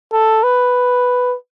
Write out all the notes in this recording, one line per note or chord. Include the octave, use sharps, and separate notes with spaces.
A4
B4